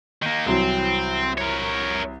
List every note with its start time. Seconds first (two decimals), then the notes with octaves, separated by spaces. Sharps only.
0.22 D#3 A#3
0.46 C2 E3 F#3 C4
1.38 A#4 C#5